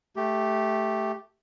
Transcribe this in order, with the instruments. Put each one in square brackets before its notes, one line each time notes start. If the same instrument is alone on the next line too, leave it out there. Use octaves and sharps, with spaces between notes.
[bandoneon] A3 G4